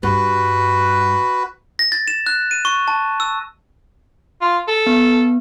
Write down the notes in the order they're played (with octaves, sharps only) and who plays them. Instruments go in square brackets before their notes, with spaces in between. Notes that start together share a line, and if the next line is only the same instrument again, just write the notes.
[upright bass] G2 [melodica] F#4 B4
[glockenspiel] A#6
A6
E7
F#6
D#7
C#6
A5
E6
[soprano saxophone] F4
A4
[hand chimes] B3